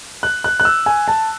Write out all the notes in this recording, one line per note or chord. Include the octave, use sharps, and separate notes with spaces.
F#6
F#6
F#6
E6
G#5
A5